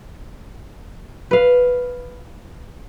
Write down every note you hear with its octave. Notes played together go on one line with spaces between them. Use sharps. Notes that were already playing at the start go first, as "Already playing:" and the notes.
B4 F5